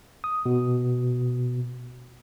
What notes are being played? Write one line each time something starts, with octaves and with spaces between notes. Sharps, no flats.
D#6
B2